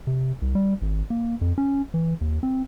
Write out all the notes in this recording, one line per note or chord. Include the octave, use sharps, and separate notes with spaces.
C3
C2
G3
G#1
A#3
F2
C#4
E3
D#2
C4